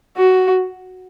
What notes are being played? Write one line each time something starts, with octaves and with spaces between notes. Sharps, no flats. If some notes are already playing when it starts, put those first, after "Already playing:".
F#4